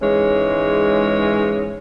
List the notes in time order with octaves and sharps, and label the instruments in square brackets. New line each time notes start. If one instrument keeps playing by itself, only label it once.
[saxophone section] G#2 E3 G#3 C#4 C#5